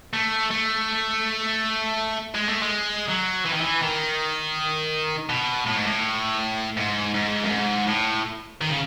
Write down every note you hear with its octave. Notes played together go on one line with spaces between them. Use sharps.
A3
A3
G#3
A3
G#3
F#3
E3
D#3
E3
D#3
B2
A2
G#2
A2
G#2
G#2
F#2
G#2
A2
D#3
C#3